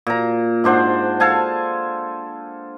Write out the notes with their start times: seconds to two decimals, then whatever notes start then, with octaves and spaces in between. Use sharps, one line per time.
0.07 A#2 A#5
0.64 G#2 D4 C5 F#5
1.20 A4 F5 G#5 A5